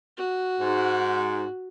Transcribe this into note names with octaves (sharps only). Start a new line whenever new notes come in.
F#4
G#2